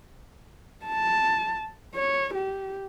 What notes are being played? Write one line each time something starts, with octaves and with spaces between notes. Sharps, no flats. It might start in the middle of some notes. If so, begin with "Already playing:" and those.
A5
C#5
G4